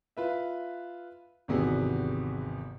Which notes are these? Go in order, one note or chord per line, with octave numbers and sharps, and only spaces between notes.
F4 B4 E5
G#1 E2 C3 B3 F#4 G#4